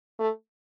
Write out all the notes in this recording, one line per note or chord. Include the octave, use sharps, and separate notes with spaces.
A3